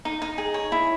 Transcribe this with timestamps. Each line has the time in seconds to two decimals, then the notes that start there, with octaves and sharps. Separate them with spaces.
0.05 D#4
0.22 D#4
0.38 G#4
0.54 C#5
0.72 E4